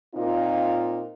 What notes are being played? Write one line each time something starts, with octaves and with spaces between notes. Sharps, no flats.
A#2 C4 D#4 F4